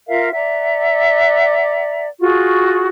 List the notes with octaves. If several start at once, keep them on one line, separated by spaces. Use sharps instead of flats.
F4 A#4 E5 F5
D5 E5 F#5 A#5
F4 F#4 G#4 C#6